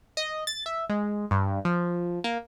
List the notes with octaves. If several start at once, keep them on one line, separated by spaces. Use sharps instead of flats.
D#5
A6
E5
G#3
G2
F3
A#3